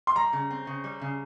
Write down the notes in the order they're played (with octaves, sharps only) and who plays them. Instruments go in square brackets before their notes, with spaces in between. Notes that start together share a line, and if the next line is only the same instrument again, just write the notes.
[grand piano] C6
[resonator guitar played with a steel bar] G3 [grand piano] A#5
[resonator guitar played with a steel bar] C#3
C4
C#3
G3
C#3